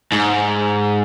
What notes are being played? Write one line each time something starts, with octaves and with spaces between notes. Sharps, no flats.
G#2